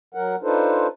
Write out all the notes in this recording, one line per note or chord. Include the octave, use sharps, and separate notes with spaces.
F#3 A#4 F#5
D4 D#4 F4 A4 B4 C5